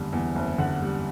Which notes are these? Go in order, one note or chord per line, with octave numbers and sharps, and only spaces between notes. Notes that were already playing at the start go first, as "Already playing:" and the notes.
Already playing: F#1 E2 D3 G3
E2
F#1
D3 F#5
G3